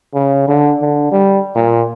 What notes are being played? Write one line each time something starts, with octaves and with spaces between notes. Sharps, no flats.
C#3
D3
D3
G3
A#2